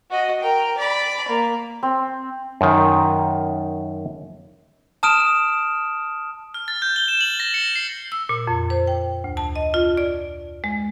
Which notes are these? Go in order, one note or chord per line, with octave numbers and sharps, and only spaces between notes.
F#4 D#5
A#4 G5
D5 B5
A#3
C4
F#2 D#3
A5 D#6 F6 D7 E7
F6
A6
G6
G7
E7
F#7
A#6
C#7
C7
E6
A#2
F2
C5
G5
D2
A5
D#5
F4
D5
G#3